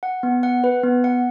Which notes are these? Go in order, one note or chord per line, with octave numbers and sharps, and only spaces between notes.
F#5
B3
F#5
B4
B3
F#5